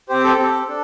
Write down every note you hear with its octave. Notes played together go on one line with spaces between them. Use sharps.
C4 G4 C5
A4
C4 G4
D4 A4